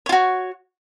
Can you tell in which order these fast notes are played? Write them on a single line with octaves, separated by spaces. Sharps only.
C#5 F4 F#4